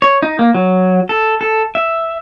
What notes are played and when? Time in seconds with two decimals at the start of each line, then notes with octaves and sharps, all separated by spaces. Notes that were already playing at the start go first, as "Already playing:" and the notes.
0.02 C#5
0.22 D#4
0.39 A#3
0.54 F#3
1.09 A4
1.41 A4
1.75 E5